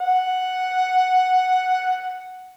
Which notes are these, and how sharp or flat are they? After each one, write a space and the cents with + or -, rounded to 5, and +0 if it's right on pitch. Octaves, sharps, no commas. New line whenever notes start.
F#5 +0